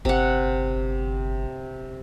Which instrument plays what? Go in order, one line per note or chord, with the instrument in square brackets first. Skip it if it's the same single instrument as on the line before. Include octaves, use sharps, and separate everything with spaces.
[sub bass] G1 [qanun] C3 F#5